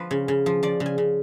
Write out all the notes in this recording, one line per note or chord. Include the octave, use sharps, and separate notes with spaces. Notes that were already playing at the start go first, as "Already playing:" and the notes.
Already playing: F3 B4
C#3
C#3
F3
F3 D5
C#3
G#5
C#3